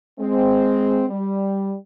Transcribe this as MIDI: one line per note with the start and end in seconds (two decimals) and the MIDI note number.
0.20 1.05 56
0.20 1.05 60
1.10 1.74 55